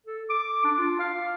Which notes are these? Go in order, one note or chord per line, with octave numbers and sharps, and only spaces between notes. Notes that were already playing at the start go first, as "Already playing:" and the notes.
A4
D6
D4
F4
F5